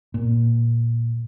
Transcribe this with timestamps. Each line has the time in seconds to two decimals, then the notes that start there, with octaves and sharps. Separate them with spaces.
0.14 A#2